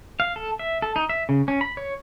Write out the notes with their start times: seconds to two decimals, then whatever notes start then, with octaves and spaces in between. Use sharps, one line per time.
0.20 F5
0.36 A4
0.59 E5
0.82 A4
0.96 D#4
1.09 E5
1.29 C#3
1.48 C#4
1.61 B5
1.77 C#5